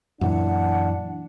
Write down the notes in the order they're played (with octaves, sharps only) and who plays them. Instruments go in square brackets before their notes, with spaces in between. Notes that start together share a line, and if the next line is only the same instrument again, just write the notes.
[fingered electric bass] F#2 A#2 E3 [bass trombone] D4 [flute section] F#5